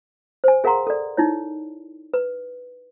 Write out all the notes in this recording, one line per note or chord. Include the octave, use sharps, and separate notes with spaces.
C5 G#5
G#4 A#4 F5 F#5 A#5 C6
A4 D5
D#4 E4 C#5
B4